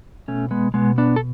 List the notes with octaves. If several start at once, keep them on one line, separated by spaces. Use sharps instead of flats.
B2 A3 C#4
G#3 B3
B2 G#3 B3
B3 D4
A4